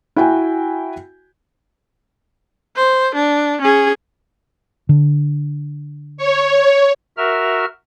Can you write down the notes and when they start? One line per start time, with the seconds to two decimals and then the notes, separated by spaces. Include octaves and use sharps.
0.16 E4 F#4 G5 G#5
2.76 C5
3.15 D4
3.61 C#4 G#4
4.89 D3
6.17 C#5
7.17 F#4 A#4 E5 F6